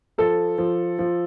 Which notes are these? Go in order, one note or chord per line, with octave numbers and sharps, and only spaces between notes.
F3 A4
F3
F3